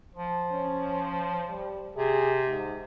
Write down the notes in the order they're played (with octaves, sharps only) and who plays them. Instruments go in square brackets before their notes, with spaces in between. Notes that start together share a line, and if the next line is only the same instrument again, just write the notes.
[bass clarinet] F3
[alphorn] C#4
G3
[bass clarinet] C3 [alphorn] G#4
[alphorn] G#2